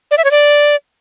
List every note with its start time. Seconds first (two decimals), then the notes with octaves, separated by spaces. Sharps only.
0.11 D5
0.18 E5
0.24 C#5
0.31 D5